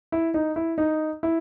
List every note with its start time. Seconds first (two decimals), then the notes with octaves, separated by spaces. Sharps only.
0.12 E4
0.34 D#4
0.56 E4
0.78 D#4
1.23 E4